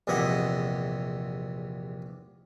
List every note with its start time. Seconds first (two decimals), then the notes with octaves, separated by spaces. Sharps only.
0.07 A#1 E2 C3 E4 D#5 F#5